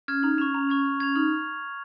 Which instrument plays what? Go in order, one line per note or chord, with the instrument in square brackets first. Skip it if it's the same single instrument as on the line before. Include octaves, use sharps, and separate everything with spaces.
[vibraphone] C#4 [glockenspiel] F6 G#6
[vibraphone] D#4 [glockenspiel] A#5
[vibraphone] C#4 [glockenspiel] C#6 G#6 F7
[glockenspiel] A#5
C#6 G#6 F7
F6
G#6 F7
[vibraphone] D#4 [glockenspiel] F6